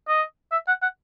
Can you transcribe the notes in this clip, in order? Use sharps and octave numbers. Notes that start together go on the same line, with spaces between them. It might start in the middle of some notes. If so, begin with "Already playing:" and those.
D#5
E5
F#5
F#5